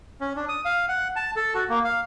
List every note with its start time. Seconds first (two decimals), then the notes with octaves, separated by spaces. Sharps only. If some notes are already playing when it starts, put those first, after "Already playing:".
0.21 C#4
0.36 D4
0.49 D#6
0.65 F5
0.89 F#5
1.16 A5
1.36 A4
1.55 F#4
1.69 A#3
1.85 F5